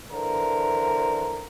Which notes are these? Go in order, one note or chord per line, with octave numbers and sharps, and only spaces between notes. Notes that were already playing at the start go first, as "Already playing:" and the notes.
D3 E3 D4 A#4 C5